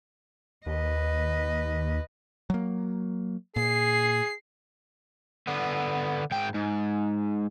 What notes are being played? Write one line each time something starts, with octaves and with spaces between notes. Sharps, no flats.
D#2 B4 D#5
F#3 A#3
A#2 G#4 C7
D3 B3
G#2 G5
G#2